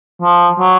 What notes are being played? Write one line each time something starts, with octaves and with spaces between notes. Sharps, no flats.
F3
F#3